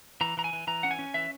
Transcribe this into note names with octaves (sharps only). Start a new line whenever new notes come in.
E3 A#5
E3 A#5
G#5
E3
E3 A#5
C#4 F#5
G#5
C#4
E3 E5